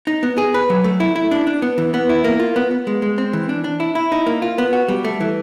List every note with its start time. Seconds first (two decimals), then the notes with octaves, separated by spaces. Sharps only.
0.07 D#4
0.23 B3
0.38 G#4
0.54 B4
0.70 F#3
0.84 A3
1.00 E4
1.16 E4
1.31 D4
1.47 D4
1.62 B3
1.78 E3
1.94 B3
2.09 E4
2.24 A#3
2.40 F4
2.56 B3
2.71 B3
2.87 G#3
3.02 G#3
3.18 C4
3.33 E3
3.49 D4
3.64 D4
3.80 E4
3.95 E4
4.12 D#4
4.26 A#3
4.42 F4
4.58 B3
4.73 F#4
4.88 G3
5.04 A3
5.20 E3